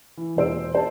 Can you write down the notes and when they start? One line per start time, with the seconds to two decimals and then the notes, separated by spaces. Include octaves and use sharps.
0.17 E3
0.36 E1 A#2 C5 E6 D7
0.75 C5 A5